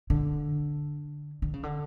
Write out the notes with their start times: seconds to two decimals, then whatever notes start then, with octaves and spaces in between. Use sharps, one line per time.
0.10 D3
1.42 D3
1.54 C#3
1.63 D3